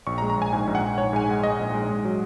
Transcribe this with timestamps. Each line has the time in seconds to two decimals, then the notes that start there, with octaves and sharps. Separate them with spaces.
0.07 A#1 C#6
0.18 A#5
0.22 G#3
0.30 A#5
0.37 A#1 G#5
0.53 G#2 G#5
0.67 A#1
0.75 F#5
0.83 A#1
0.98 G#2 C#5
1.13 G#2 G#5
1.29 G#3 F#5
1.43 G#3 D#5
1.59 A#1
1.73 G#3
1.89 G#2
2.05 F#3